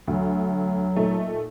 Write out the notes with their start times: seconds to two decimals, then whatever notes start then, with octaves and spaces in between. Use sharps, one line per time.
0.07 D2 F#3
0.95 A#2 A3 D#4